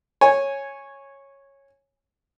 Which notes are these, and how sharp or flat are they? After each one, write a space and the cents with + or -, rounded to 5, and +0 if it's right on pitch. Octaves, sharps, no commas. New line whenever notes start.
C#5 -10 G#5 +0